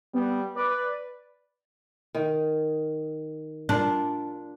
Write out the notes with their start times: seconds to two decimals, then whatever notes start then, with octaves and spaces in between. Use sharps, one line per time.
0.14 G3 B3
0.56 B4 D5
2.15 D#3
3.69 D4 F4 A#4 F5